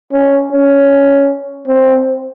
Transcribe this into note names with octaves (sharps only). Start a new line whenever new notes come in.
C#4
C#4
C4